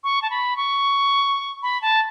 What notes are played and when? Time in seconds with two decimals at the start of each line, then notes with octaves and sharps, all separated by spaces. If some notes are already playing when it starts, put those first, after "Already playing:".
0.04 C#6
0.22 A5
0.30 B5
0.57 C#6
1.62 B5
1.82 A5